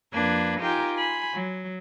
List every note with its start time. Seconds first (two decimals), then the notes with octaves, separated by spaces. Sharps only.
0.13 F2 A#3 D4 B4 G#6
0.60 D#4 F4 G4 A#4 G5 G#5
0.94 G#5 B5 C6
1.33 F#3